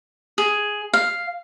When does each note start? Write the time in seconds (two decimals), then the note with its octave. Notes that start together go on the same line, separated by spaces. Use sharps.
0.38 G#4
0.93 F5